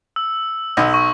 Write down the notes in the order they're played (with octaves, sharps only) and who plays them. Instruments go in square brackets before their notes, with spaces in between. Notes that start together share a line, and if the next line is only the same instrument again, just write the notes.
[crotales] E6
[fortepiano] B1 D#5
[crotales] C#6